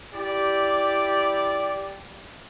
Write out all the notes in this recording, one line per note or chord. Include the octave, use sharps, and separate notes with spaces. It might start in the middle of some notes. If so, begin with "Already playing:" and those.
E4 G4 D5